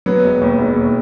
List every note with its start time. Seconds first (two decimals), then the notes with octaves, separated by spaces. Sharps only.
0.06 F#3 B3
0.24 E1
0.41 D#2
0.59 E1
0.76 D#2